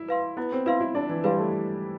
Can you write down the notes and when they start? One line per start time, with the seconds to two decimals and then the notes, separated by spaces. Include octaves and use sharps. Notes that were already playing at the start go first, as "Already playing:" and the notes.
Already playing: E4
0.09 B4 F5 C6
0.37 B3 E4
0.52 C4
0.66 E4 B4 F5 C6
0.80 E4
0.95 D4 E4
1.09 E3
1.24 G3 B4 F5 C6
1.39 A3